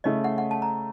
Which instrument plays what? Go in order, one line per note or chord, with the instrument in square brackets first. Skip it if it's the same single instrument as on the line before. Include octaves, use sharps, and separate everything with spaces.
[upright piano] C#3 A3 C#4 [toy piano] D#5
[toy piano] F#5
F#5
A5
A#5